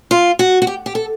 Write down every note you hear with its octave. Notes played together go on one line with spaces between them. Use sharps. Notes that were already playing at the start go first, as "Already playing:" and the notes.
F4
F#4
F#4
G4
G4
A4